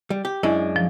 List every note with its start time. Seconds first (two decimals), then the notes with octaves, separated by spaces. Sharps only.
0.10 G3
0.25 G4
0.43 F#2 G#3 D4 E4
0.76 F3